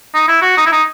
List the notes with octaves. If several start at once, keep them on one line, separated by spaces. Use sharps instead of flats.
D#4
E4
F#4
D#4
E4
D#4